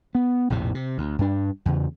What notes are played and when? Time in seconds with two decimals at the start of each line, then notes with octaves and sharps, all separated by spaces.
0.15 B3
0.50 A#1 F2 A2 C3
0.75 C3
0.98 D2
1.19 G2 D4
1.66 E2 C#3